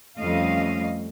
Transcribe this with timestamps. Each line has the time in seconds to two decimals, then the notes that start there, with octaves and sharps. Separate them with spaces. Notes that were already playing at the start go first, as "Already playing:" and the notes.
0.17 F2 G3 A3 C#4 D#5 F5